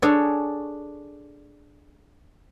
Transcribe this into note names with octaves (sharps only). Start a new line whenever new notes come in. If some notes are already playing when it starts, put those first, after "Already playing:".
D4 G#4 A4 C#5